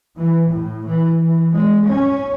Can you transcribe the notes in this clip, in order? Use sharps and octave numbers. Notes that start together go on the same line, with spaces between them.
E3
A2
E3
E3
G#3
C#4